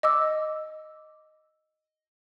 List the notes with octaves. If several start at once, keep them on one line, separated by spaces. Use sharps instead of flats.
D#5 D6 E6